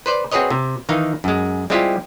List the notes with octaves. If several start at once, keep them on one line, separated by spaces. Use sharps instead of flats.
B4 C5 D5
C4 F#4 G#4 B4 C#5 D#5
C3
D#3 E3 D#4 F5
F#2 G#3
G3 G#3 C4 E4 F4 G4